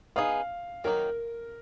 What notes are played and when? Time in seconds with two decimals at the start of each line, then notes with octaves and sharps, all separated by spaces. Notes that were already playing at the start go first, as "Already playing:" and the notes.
0.16 B3 D#4 G#4 F5
0.84 D#3 F#3 A#3 D#4 A#4